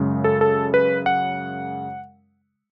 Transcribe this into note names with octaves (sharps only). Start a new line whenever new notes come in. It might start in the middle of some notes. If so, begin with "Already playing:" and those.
Already playing: F#2 C#3 G#3
A4
A4
B4
F#5